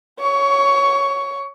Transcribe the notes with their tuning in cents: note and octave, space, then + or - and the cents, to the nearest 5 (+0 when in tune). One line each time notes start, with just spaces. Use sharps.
C#5 +0 C#6 +20